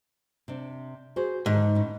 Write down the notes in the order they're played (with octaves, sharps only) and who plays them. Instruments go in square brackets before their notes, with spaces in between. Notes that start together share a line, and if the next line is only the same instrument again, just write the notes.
[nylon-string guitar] C3 D4
F#4 G#4 C5
[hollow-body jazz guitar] G#2 [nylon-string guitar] D3 D#3
[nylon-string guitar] A2 C#4